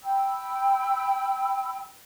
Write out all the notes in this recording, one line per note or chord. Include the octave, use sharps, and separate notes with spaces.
G5 B5 E6